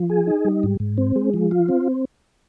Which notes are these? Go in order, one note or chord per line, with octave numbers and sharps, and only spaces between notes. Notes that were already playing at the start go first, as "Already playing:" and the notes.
Already playing: F3
G#4
D#4
G3
G#2
G#2
C4
G#3
F3
F4
C4